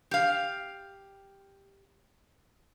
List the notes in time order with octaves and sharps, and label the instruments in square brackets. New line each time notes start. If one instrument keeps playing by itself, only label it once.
[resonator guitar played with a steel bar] G4 F5